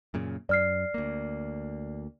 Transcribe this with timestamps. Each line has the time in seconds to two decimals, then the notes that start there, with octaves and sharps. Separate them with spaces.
0.14 F#2 A#2 C#3
0.49 F#2 D5 F6 C7
0.94 D2 A#3